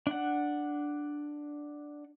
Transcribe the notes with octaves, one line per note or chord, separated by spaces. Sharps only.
D4 F#5